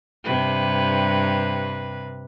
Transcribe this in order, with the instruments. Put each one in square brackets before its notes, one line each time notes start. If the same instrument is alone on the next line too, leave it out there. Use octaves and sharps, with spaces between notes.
[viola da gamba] G2 C3 B4